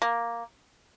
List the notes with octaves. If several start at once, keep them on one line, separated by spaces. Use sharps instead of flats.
A#3